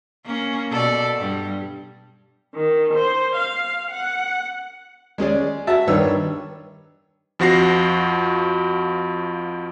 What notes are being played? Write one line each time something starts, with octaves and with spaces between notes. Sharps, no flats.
A#3 C#4
B2 A4 D5
G2 G3
D#3
C5
F5
F#5
G#3 C#4 G#4 D5
F#4 E5 A5
G2 D#3 D4 B4 C#5 E6
F2 F3 F#4 A#6 C7